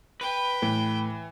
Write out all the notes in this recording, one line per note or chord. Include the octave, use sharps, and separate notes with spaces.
B4 G5
A2 E3